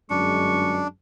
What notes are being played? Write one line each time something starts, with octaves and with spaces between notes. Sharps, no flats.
G1 F#2 G#3 D4 C#6